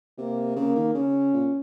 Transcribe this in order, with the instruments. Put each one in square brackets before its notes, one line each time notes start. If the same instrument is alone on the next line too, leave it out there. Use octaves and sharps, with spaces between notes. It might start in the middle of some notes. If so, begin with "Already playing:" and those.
[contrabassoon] C3 [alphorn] A#3
[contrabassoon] C#3 [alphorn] A#3
[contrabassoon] D#3
[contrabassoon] C#3 [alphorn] C#4
[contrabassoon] A#2